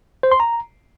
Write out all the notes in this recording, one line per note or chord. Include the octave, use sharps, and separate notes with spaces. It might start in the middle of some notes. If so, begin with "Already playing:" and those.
C5
C6
A#5